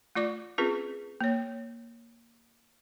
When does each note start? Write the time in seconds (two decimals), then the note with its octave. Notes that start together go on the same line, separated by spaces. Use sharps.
0.15 A3 F4 D5 D6
0.58 C4 C#4 F4 G#4 A#4 B4
1.21 A#3 C#5